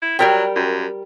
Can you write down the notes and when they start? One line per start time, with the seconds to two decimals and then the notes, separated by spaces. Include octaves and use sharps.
0.02 E4
0.19 F#3 G3 A#4 G5
0.56 F#2